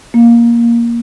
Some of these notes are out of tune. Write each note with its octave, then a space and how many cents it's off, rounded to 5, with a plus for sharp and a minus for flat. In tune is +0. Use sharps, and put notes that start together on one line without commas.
A#3 +10